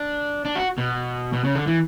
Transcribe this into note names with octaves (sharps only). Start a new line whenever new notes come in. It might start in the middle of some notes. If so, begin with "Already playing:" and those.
Already playing: D4
D4
F#4
B2
B2
C#3
D3
E3